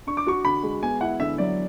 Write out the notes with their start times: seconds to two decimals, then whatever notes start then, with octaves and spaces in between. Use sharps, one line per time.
0.07 D4 C#6
0.17 D6
0.27 F#4 C#6
0.45 D3 B5
0.63 G#3
0.82 B3 G#5
1.01 E4 F#5
1.20 D3 E5
1.38 F#3 D5